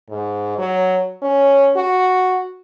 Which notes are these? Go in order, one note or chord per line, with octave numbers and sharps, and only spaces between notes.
G#2
F#3
C#4
F#4